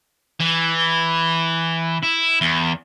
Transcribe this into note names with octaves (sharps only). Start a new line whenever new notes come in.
E3
E4
E2